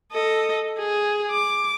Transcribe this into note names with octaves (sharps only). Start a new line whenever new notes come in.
A4 D#5
G#4
D6